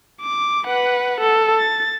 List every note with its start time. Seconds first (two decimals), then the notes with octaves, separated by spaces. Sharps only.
0.21 D6
0.66 B4 F#5
1.20 A4
1.57 A6